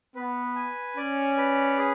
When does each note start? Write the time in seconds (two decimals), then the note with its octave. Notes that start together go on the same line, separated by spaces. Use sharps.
0.15 B3 B4
0.56 G#5
0.97 C#4 D5
1.37 B4
1.78 G#4